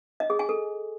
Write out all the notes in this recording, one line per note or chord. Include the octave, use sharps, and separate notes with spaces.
D#5
G#4
G#5
A4